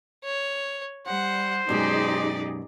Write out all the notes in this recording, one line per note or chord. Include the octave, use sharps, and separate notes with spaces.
C#5
G3 C5 F#5
F#2 B2 G#3 D#4 G4 G#4 D5